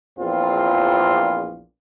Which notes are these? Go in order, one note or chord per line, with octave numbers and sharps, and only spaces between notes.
A#1 E2 C4 F4